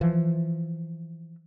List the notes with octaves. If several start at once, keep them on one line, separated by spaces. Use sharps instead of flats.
E3 F3